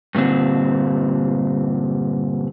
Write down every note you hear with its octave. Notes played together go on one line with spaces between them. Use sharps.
G2 A#2 D3 C4